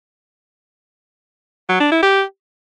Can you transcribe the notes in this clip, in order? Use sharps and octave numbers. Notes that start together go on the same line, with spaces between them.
F#3
D4
E4
G4